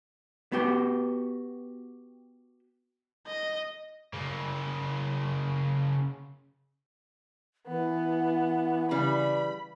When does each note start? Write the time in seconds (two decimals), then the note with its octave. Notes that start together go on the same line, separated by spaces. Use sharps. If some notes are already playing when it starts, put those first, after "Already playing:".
0.52 B3 F#4 G4
3.27 D#5
4.14 C#3 A#3
7.67 E3 B3
8.91 C#3 G3 B5